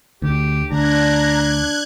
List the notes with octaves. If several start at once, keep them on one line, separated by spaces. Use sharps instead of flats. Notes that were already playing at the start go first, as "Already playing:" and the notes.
D2 G4
D2 D4 A#5 F#6 G#6